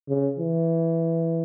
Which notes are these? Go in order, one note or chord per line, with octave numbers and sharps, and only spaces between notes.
C#3
E3